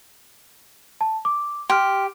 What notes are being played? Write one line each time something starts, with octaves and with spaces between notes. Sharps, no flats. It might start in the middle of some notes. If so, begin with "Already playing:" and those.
A5
D6
G4 C6 F6